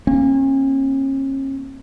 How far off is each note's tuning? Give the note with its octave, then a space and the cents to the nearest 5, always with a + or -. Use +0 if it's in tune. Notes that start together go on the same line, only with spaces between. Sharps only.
A#3 +15 C#4 -40